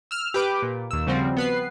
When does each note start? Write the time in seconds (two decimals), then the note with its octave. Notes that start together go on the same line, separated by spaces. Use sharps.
0.11 E6 F6
0.34 G4 B4 D6
0.62 A#2
0.91 D#2 E6
1.07 C#3 F3 G3 C4 F#4
1.37 B3 B4 C7